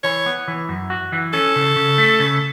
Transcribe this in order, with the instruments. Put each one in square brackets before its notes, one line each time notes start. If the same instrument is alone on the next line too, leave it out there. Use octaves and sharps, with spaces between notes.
[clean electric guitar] E3 [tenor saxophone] C#5
[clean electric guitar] B3
E3
F#2
F#4
E3
[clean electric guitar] C#4 [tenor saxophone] A4
[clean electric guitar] C#3
C#3
A3
C#3